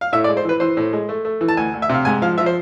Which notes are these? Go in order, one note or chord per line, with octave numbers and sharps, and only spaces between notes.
F5
A2 E5
D5
G#3
C5
E3 B4
E3 C5
A2
G#3
A3
A3
E3
A5
D2 G#5
D2
E5
C3 F5
G#2 G#5
F3 F5
F3 E5
C5